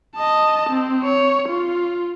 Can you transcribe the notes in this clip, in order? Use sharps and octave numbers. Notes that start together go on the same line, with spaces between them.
D#5 A5
C4
C#5
F4